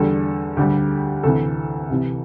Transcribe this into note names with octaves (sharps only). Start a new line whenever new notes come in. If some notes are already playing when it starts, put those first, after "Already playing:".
Already playing: E2 D3 G3 A4
D2 D3 G3 G4
D2 C3 E3 A4
C2 C3 E3